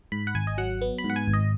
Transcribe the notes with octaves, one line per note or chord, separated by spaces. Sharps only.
G#2 B5
F#5
G#1 G#5
D#5
F#3 F#5
B3
B5
G#2
F#5
G#5
G#1
D#5